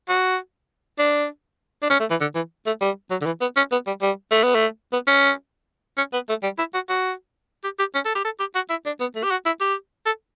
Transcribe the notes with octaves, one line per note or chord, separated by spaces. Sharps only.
F#4
D4
D4
C#4
A3
E3
D3
E3
A3
G3
F#3
D3
E3
B3
C#4
B3
G3
G3
A3
B3
A3
B3
C#4
C#4
B3
A3
G3
E4
F#4
F#4
G4
G4
C#4
A4
G4
A4
G4
F#4
E4
D4
B3
A3
G4
F#4
E4
G4
A4